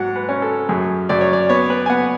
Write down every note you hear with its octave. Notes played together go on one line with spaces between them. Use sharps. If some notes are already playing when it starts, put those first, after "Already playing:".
Already playing: G#2 F#3 F#5
B4
C#4
A4
F#2 G#4
F#2 D5
C#5
D5
B3 C#5
B4
G#5
B3 F#5